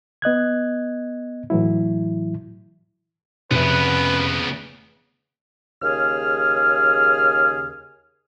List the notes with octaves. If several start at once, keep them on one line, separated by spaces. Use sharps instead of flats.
B3 D#5 F#6 G#6
A2 E3 F#3 E4
F1 C#3 B3 B4 E5
D#2 C#3 G#4 F6